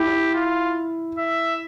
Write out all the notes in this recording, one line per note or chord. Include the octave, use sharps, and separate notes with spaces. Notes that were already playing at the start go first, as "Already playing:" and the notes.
Already playing: E4 G4
F4
E5